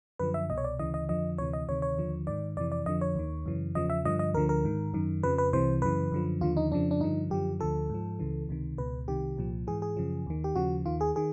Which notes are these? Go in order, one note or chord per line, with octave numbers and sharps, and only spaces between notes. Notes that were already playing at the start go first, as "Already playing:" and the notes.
F#2 D3 F3 B4
E5
C2 B2 D#5
C#5
D5
D2 C#3 E3 D#5
D#5
F2 D3 F3 D#5
D2 C3 E3 C#5
D#5
D2 C3 D#3 C#5
C#5
D#2 D3 F3
G#2 D#3 D5
F2 C3 E3 D5
D5
F2 D3 F3 D#5
C#5
D#2 D#3
F#2 C#3 E3
E2 C#3 F3 D#5
E5
G2 D3 F3 D#5
D#5
D2 D3 F3 A#4
A#4
G#2 D#3
F#2 D#3
F2 C#3 F3 B4
B4
C2 C3 E3 C5
F#2 C#3 E3 B4
F#2 D3 F3
D#2 D3 F3 F4
D#4
F2 C#3 F3 D4
D4
G2 D3 F3 D#4
F#2 D3 F3 G4
D2 D3 F3 A4
G#2 F3
C#2 C#3 E3
C#2 C3 D#3
C#2 B2 B4
C2 C3 D#3 G4
C2 A#2 F3
G#2 E3 G#4
G#4
F#2 C#3 F3
D#2 D#3
G4
D#2 C#3 F3 F#4
D#2 D#3 F4
G#4
D#3 G#4